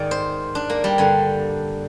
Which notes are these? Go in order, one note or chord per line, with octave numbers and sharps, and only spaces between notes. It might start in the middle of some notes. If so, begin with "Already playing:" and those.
Already playing: G#2 D#3 D5
C5
D4
A#3
G3
G2 D3